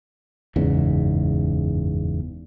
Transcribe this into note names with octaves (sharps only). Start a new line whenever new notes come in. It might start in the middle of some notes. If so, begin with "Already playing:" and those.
F#1 E2 G#2 C#3